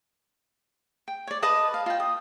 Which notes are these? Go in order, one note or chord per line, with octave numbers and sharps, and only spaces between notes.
G5
C#5 D5
B4 D#5 A5 D#6
F5
F4 G5
D#6